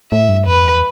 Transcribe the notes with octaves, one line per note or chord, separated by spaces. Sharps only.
A2 E5
G2
F2 B4
E2